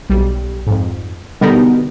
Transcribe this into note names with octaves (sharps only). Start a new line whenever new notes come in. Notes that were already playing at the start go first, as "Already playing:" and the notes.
B1 G3
F2 G#2
B2 D3 G3 B3 D#4 A#4